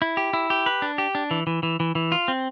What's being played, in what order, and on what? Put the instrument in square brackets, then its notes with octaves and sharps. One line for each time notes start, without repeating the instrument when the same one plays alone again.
[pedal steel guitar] E4
G4
E4
G4
B4
D4
G4
D4
E3
E3
E3
E3
E3
F4
C4